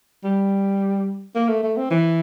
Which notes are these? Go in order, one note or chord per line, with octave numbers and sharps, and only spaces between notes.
G3
A#3
A3
A3
C4
E3